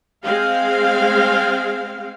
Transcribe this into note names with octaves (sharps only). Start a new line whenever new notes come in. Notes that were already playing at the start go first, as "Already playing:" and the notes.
G#3 C4 F5